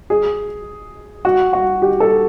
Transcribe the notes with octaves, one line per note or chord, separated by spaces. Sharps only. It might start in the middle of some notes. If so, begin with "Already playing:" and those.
G#4
F#4
F#4
G4
A4